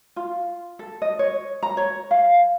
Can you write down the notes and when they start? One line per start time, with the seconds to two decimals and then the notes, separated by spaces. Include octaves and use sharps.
0.16 F4
0.79 A4
1.02 D#5
1.19 C#5
1.63 A#5
1.77 C#5
2.11 F5